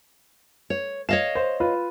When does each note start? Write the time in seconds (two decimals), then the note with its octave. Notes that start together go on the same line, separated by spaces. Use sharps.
0.70 C#5
1.09 C#5 D#5 F5 E7
1.35 C5
1.60 F4 B4